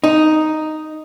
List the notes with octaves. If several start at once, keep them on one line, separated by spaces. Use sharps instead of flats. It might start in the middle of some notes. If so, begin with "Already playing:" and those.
D#4